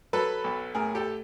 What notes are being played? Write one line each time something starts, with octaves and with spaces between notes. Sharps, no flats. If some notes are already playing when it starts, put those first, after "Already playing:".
F#3 A4 B4
B1
A2 G#4 A#4
G4 A4